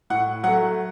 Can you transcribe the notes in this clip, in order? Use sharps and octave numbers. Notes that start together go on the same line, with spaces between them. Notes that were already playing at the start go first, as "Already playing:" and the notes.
A2 F#5
F#3 A3 F#5